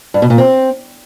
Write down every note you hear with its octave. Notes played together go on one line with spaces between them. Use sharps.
G2
B2
A#2
C4